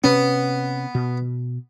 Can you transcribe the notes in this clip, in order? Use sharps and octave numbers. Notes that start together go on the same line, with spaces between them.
C3 B3 C#4
B2